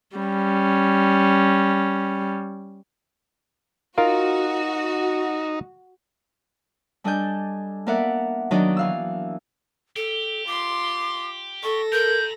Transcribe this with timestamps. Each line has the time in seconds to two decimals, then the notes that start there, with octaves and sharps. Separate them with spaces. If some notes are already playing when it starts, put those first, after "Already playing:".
0.17 G3 C#4
3.98 D#4 F4 F#4 A#4 F5
7.04 G3 D4 A4 D#5 G#5 G6
7.87 A#3 B3 A#4 D5 E5 F#5
8.51 D#3 F#3 D4 D#4 D5 D#5
8.77 E3 F5 E6
9.96 G4 A4
10.47 F4 C6 D6
11.63 A4 C#6 A#6
11.92 A#4 A#5 C6 G6